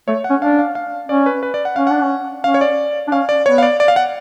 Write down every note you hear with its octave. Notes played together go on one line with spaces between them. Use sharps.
A3 C#5
F#5
C#4
D4 F5
F5
F5
C#4 D5
B4
B4
D5
F#5
C#4 F5
D4 F#5
C#4
C#4 F5
C#5
D5
D4
C#4 F5
D5
B3 C#5
F5
D5
D5
F5
F#5